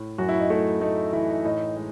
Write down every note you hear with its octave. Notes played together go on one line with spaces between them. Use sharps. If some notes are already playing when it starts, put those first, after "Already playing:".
Already playing: A2
F#2 F#4
E4
D#4
A3 E4
A3 D#4
E3 E4
D#4
A2 D#4
G#3